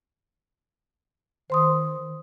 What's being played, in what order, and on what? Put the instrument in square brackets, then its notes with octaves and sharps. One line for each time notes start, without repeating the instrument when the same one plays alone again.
[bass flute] D#3 [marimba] C5 C6 D#6